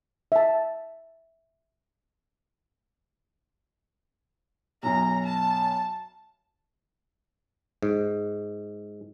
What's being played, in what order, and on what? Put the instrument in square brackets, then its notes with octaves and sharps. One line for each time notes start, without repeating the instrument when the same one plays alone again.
[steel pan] E5 A5
[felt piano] B1 F#2 [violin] A#5
[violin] A5
[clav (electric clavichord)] G#2